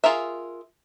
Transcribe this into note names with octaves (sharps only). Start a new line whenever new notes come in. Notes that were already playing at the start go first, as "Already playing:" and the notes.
F4 G#4 A#4 E5